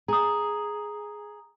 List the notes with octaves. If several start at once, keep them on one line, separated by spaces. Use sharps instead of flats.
G#4 A#5 D#6